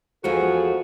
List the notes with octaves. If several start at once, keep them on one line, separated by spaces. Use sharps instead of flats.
E2 F3 G#3 F#4 A4